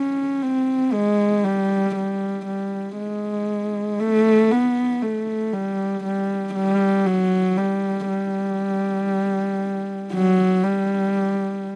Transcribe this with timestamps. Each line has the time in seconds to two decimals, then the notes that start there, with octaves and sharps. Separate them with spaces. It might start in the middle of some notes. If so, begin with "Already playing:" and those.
Already playing: C#4
0.42 C4
0.93 G#3
1.45 G3
1.96 G3
2.47 G3
2.97 G#3
4.00 A3
4.52 B3
5.02 A3
5.53 G3
6.05 G3
6.55 G3
7.07 F#3
7.57 G3
8.09 G3
10.13 F#3
10.64 G3